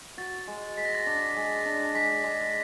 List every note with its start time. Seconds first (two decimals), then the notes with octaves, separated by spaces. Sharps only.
0.18 F#4 A6
0.48 G#3
0.77 G#3 B6
0.85 A#6
0.95 A6
1.04 D4 A#6
1.37 G#3
1.66 D4
1.94 G#3 B6
2.24 G#3